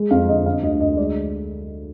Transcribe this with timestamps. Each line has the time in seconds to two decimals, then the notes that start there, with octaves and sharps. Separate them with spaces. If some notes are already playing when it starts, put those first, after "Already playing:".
Already playing: G#3
0.11 F2 F5
0.29 D3 D#5
0.46 D3 F5
0.63 D2 D#5
0.80 D2 D#5
0.97 G#3 D5